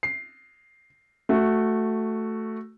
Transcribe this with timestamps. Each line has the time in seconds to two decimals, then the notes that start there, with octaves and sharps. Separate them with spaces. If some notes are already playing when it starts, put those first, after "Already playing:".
0.03 C7
1.29 A3 F#4